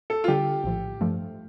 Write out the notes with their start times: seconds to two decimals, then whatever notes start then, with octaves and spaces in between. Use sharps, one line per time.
0.10 A4
0.24 F4
0.28 D3 G3 D4 G4 A4
0.64 A#1 A2 F3
1.01 G2 F3 A3